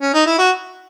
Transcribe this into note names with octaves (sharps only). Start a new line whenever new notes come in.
C#4
D#4
E4
F#4